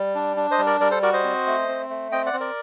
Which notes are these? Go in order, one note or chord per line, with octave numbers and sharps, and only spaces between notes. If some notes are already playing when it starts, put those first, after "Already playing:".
Already playing: G3
D4
D4
C5 D#5
G3
A#4 D5
G3 A#4 D5
A4 C5
F#4 A#4 D5
C5 D#5
C4
A3
C4
A3
C4 D#5 G5
D5 F#5
C4
A#4 D5